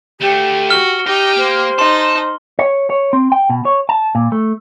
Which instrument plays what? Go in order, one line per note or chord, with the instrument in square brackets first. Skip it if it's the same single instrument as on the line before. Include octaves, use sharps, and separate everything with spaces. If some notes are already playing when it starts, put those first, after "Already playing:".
[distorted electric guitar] D2 A3 [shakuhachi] G4
[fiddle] F#4 [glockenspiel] F6 G7
[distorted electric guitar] D#4 [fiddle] G4
[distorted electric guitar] A#3 [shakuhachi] C5
[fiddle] D#4 [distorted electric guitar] A5 [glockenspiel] C6
[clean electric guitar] C#5
C#5
C4
G5
B2
C#5
A5
A#2
A3